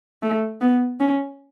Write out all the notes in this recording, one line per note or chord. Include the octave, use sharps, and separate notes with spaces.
A3
B3
C#4